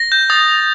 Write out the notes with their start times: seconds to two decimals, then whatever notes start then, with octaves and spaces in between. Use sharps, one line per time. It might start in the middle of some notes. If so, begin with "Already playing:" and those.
Already playing: A#6
0.12 G6
0.30 D#6 A6
0.48 D#6